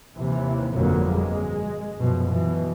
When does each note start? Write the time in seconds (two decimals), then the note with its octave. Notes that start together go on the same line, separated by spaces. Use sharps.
0.17 D#2 C3 E3
0.75 G1 F2 B2 D3 F#3 A#3
1.15 G#3
1.98 F#2 B2 F3
2.31 B2 E3